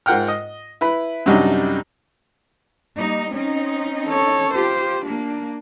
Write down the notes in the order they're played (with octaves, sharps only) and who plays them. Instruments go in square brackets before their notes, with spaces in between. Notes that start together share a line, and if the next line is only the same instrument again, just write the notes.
[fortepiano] G#2 F4 A#4 F#5 G5 F6
D#5
E4 B4 B5
F#2 C3 F#3 G3 D4 D#4
[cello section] G3 A#3 D#4
C4 C#4 D#4
[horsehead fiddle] A4 C#5
[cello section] F4 G4 [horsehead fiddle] C5
[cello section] A#3 [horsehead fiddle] D4